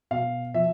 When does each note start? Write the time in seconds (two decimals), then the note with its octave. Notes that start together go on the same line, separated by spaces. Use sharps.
0.11 B2 F5
0.54 F3 E5